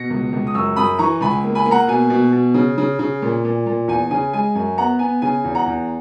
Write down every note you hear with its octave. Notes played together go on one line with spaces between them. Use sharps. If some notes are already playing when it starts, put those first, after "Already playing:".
Already playing: B2 A#6 C#7
C#2
C#2
D#6
F#2 C#6 E6
F#2 B5 D#6
E3 A#5 C#6
C#2 G#5 B5
A#3
G#5 B5
A#3
F#5 A#5
B2 G#5
B2
B2
C#3
C#3
C#3
A#2
A#2
A#2
E2 G#5
C#3 G#5
G#3 G#5
F#2 G#5
B3 F#5 A#5
B3 G#5
C#3 G#5
E2
F#5 A#5
E2